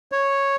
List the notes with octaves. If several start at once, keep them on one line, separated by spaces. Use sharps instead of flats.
C#5